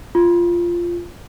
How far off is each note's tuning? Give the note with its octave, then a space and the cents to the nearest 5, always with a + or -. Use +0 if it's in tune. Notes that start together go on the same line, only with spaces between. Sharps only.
F4 -10